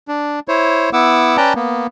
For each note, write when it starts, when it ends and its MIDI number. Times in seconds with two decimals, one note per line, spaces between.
0.08 0.40 62
0.48 0.90 64
0.48 0.90 72
0.48 0.90 73
0.93 1.37 59
0.93 1.37 64
0.93 1.37 78
0.93 1.37 86
0.93 1.37 88
1.37 1.53 61
1.37 1.53 71
1.37 1.53 74
1.37 1.53 79
1.37 1.53 81
1.37 1.53 82
1.56 1.87 58
1.56 1.87 59